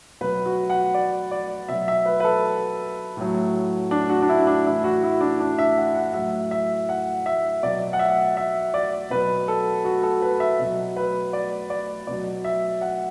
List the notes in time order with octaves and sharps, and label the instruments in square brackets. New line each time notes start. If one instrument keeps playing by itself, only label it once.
[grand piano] B2 F#3 B4
F#4
F#5
D5
D5
B2 F#3 E5
E5
B4
B4
A4
A2 F#3
D4
F#4
D4
E4
D4
A2 E3 E4
F#4
E4
D4
D4
E5
F#5
F#5
A2 F#3 E5
E5
F#5
E5
B2 F#3 D5
F#5
E5
E5
D5
B2 F#3 B4
A4
F#4
A4
B4
E5
B2 F#3
B4
D5
D5
B2 F#3 D5
E5
F#5